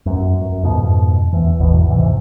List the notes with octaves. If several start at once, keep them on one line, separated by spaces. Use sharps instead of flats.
F#2
F#2
F2 G#2 B2
E2 E3
G#1 E2 B2
D1 G#2 C3 E3